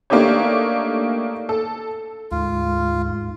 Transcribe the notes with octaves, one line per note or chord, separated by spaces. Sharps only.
A3 A#3 D4 D#4 G4 C#5
A4
D2 G#2 F4